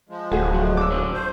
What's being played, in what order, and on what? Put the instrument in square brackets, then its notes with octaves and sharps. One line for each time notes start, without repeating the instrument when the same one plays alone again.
[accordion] F3 G#3
[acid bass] D1 [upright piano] A3 F#4 G#4
[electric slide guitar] F#3
[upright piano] D6 E6
[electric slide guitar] F#3 C#4 D4
[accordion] C5